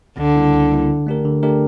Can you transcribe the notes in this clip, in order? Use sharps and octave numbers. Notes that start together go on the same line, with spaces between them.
C#2 D3
C#3 G3 A#3 E4
C#2
C#3 G3 A#3 E4
D3
A3 D4 G4 A#4
D3
A3 D4 G4 A#4